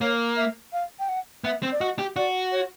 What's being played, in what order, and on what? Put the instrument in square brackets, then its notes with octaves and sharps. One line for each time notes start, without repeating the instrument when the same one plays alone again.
[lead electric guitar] A#3 [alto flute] C#5
[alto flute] E5
F5
G5
F#5
[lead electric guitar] B3 [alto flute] E5
[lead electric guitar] C4
[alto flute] D5
[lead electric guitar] F#4 [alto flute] D#5
[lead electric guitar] G4
[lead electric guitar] F#4 [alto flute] D5
[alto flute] C#5